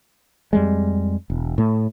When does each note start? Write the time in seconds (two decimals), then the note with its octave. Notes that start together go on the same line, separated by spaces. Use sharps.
0.53 F2 G3 G#3
1.30 E1
1.58 A2 A3